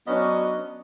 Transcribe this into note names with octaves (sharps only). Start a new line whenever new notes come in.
F#3 B3 C#4 D4 D#5